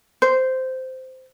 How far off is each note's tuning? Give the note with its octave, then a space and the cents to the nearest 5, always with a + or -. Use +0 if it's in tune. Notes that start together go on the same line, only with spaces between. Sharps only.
C5 -10